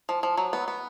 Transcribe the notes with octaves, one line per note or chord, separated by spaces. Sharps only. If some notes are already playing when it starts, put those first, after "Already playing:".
F3
F3
F#3
B3
B3